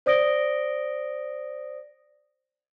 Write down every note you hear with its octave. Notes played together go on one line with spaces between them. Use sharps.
C5 D5 D#6 A#6 D7 G7